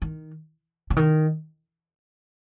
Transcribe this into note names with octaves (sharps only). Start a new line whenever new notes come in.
D#3
C#3
D#3